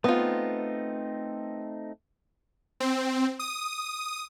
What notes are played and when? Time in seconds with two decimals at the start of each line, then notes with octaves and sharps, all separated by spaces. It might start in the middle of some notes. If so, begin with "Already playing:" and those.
0.04 A3 B3 C4 D#4 F4
2.80 C4
3.39 D#6